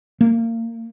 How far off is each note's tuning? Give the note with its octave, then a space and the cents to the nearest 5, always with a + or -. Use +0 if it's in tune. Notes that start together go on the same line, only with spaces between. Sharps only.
A#3 -25